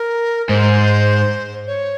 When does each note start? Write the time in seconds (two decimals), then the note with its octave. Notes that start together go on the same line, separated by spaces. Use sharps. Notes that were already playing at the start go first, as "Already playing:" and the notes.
Already playing: A#4
0.49 G#2 C5
1.67 C#5